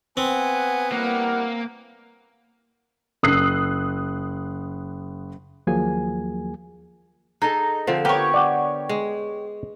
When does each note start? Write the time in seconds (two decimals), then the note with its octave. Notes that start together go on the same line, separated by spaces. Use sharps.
0.17 B3 C4 F#5 G#5
0.92 G3 A#3 E4 F#5
3.23 F#1 D#6 E6 F#6 C7
5.67 D#2 F3 F#3 A#3 G#4 G#5
7.42 D#4 G#4 A4
7.87 D3 F3 C4
8.05 B3 G4 A#4 C#5
8.34 D5 F#5 G5
8.89 G#3